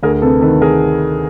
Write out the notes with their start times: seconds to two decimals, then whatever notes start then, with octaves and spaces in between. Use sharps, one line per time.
0.03 D2 G#4 A#4
0.22 C3 A4 B4
0.42 D#3 A4 B4
0.62 G#4 A#4